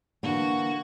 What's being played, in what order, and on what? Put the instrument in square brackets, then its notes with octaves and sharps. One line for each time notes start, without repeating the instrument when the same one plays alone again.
[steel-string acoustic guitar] D3 E3 A#3 [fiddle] F#4